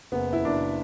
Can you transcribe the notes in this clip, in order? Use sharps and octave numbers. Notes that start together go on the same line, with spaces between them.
F#1 B3
E4
F#1 D4